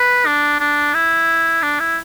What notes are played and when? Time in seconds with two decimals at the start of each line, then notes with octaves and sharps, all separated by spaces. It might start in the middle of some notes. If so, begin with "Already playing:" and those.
Already playing: B4
0.26 D4
0.60 D4
0.94 E4
1.63 D4
1.80 E4